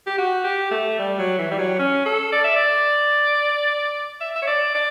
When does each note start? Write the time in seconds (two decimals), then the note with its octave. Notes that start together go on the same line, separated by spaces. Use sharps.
0.06 G4
0.18 F#4
0.44 G4
0.71 A3
0.99 G3
1.19 F#3
1.38 E3
1.51 G3
1.58 F#3
1.79 C#4
2.06 A4
2.32 D5
2.44 E5
2.56 D5
4.21 E5
4.36 E5
4.42 C#5
4.47 D5
4.75 D5